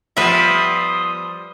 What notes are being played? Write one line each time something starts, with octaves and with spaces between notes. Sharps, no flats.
F3 G3 B3 B4 E5 C6 D#6